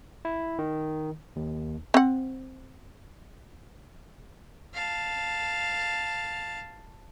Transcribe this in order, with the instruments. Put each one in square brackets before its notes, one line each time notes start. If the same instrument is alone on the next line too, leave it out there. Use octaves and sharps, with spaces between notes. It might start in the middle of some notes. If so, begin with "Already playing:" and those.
[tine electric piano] E4
D#3
D#2
[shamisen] C4 F#5
[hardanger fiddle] F5 A5